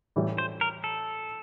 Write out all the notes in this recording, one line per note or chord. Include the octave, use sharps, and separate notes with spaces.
A2 E3 G3
C5
A#4
A4